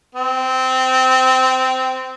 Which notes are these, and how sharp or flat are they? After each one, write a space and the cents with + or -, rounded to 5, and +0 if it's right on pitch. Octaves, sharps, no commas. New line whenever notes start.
C4 -15